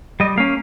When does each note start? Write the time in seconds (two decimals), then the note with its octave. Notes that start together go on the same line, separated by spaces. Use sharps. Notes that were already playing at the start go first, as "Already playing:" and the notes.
0.20 G3 D#5
0.37 A#3 C#4 F5